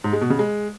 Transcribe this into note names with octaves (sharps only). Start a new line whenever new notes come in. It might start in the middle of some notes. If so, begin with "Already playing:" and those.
G#2
G#3
B2
C#3
G#3